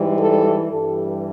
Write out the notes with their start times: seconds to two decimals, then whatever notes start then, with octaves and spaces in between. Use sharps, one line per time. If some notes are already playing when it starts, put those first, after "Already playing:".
Already playing: G#2 E3 G3
0.18 A4
0.70 G2 E3 G3 A4